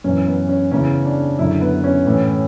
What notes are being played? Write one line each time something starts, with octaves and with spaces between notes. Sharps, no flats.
F#2 E3 C#4
B3
C#4
E2 C#3 E3 C#4
D4
F#2 D3 E4
B3
C#4
A2 E3